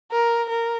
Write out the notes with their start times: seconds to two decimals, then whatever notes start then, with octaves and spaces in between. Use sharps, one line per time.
0.11 A#4
0.49 A#4